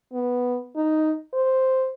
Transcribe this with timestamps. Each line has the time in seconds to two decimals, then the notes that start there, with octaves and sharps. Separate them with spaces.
0.13 B3
0.76 D#4
1.33 C5